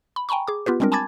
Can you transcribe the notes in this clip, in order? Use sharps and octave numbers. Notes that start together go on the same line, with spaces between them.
B5
G5 G#5 A#5 B5 C#6
G#4 D6
B3 F4 G4 B4
G3 G#3 C4 D4 A#4
G#5 A5 B5 D6 G#6 A6